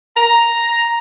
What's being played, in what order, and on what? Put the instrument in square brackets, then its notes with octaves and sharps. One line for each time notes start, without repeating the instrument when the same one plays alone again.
[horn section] A#5